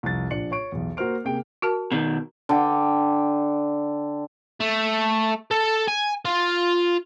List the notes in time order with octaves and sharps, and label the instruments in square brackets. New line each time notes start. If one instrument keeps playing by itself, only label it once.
[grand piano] C2 F2 A6
A#1 D4 C#7 F#7
C#5 C#6 D7
B1 E2
A#3 F#4 A#4 C5 F6 D7
C3 A#3 G#4 G5 D7
[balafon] F#4 A#4 A5
[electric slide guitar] B2 D#3
[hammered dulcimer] D3 G5
[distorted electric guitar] A3
A4
G#5
F4